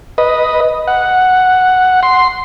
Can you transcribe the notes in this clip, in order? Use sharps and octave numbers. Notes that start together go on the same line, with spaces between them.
B4 D#5
F#5
C6